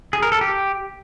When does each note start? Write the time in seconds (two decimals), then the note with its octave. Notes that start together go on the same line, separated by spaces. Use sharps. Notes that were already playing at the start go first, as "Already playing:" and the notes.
0.13 G#4
0.22 A#4
0.32 A4
0.41 G4